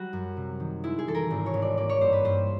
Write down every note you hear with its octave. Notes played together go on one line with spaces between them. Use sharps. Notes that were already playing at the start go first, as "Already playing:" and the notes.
Already playing: F#3 G3 F#4
F#2
C3
D#3
G#3 E4
G#4
E3 A4
A#4
G#1
C#5
G#1
D5
A#3 D5
C#5
G2 C5
B4
G2 C5